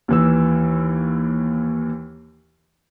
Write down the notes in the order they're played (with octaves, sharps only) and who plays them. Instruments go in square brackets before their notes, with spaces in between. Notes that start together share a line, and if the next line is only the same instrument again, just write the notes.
[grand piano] D#2 E3 E6